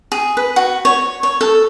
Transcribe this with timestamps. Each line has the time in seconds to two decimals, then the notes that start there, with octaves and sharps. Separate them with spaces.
0.12 G#4
0.37 B4
0.56 F#4
0.85 C#5
1.23 C#5
1.41 A4